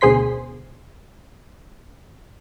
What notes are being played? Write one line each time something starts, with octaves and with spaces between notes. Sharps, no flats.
D2 B2 G#4 C5 C6 B6